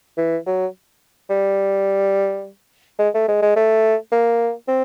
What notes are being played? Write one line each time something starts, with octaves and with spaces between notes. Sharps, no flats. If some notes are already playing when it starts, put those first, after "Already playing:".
E3
F#3
G3
G#3
A3
G#3
G#3
A3
A#3
C4